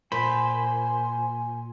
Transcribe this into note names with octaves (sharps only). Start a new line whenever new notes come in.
A#2 C5 G#5 B5